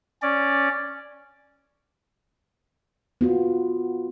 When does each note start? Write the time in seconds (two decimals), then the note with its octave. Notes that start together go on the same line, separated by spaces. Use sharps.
0.22 C#4 D5
3.21 B3 F4 F#4